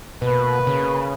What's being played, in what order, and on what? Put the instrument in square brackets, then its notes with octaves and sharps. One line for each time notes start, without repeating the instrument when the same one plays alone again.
[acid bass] B2 [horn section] A#3 B4
[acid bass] C#3